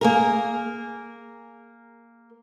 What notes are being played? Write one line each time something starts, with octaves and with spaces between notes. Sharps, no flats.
A#3 G#4 A#4